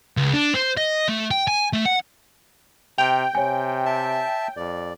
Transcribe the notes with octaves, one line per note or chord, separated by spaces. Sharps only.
C#2
D4
C5
D#5
A3
G5
G#5
A3
F#5
C3 G5 F7
C3 C#5 G#5
E5 A5
F2 D5